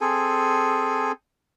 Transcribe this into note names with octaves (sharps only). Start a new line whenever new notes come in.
C4 G#4 A4 G#5